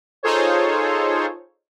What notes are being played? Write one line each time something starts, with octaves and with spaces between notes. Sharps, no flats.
D#4 F4 G#4 A4 C5 C#5